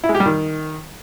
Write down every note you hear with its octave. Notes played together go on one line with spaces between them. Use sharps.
E4
G#3
G4
G3
D#3